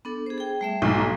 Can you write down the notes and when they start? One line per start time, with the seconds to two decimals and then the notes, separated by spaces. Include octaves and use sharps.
0.05 B3 D4 A4
0.26 G#4 C5
0.38 G#4 G5
0.61 G3 A3 E5
0.82 B1 G#2 A#3